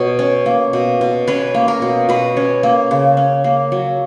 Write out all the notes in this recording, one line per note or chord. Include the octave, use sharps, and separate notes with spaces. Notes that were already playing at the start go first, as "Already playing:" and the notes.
Already playing: B2 C#5
C#4
A#3
B2
B2
C#4 B4
A#3
A#4
B2
B2 B4
C#4
A#3
C#3
C#4
A#3
F#3